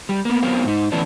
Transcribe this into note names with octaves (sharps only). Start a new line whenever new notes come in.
G3
A#3 B3
F#3 B3 C4 A#4 F5
G#2 D#4
D3 E3 A3 B3 C#4 D4